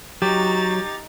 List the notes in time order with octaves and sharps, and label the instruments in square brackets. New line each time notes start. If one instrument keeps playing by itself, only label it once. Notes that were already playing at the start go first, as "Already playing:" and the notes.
[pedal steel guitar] F#3 [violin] D#4 A6 [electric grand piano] G4